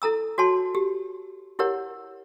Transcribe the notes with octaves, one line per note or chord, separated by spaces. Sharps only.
E4 A4 A#5 E6
F#4 C#5 A5 C6
G4
E4 G4 A#4 C#5 F#5